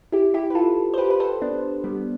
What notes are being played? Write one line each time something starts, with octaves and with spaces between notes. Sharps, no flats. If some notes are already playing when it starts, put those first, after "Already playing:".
E4 G4
E4 G4
B4
F4 A4
C5
G4 B4
B4
A4 C5
B3 D4
G3 B3